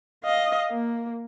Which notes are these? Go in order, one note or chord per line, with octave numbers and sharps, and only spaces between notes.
D#5 F5
A#3